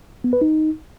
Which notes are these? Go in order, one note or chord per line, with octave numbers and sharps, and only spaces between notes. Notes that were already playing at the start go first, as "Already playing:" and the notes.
B3
B4
D#4